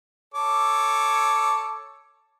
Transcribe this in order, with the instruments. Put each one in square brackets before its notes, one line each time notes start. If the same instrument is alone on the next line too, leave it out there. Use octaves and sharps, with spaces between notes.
[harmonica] A4 C#5 D6